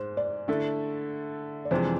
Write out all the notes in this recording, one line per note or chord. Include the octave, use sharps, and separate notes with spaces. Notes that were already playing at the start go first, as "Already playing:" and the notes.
Already playing: G#2 G#3 C5
D5
D3 A3 E4 A4
D5
F2 C3 E3 G#3 D4 C5